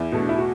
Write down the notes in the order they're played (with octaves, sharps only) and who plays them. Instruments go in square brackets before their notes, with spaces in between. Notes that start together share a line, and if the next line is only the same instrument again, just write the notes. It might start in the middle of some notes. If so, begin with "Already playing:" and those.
Already playing: [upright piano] E2 [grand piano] E4
[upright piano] B2 A3
[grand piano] D4
E4
F#4